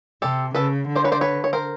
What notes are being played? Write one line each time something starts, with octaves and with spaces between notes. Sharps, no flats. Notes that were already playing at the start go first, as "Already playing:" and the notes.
C3 G4 A4
C#3 A4 B4
D3
C5 D5
B4 C#5
C5 D5
B4 C#5
C#5
A#4 C5